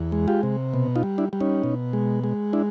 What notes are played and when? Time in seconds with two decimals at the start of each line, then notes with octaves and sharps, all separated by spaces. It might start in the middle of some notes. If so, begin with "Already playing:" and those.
Already playing: E2
0.12 G#3
0.28 F4 G4
0.43 C3
0.74 B2
0.95 D#4 F4
1.03 G3
1.18 D4 E4
1.33 G3
1.40 C#4 D#4
1.63 B2
1.93 G#3
2.24 G#3
2.53 D4 E4